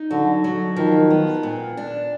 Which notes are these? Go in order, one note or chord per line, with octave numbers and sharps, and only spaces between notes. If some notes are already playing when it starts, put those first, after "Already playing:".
Already playing: D#4
D3 F#3
F#3
D#3 F3
B3
A#2
D4